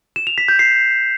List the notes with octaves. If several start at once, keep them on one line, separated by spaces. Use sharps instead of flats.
E7
F7
B6
G6
C7